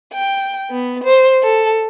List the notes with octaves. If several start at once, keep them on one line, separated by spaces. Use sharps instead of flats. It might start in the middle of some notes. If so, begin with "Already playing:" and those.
G5
B3
C5
A4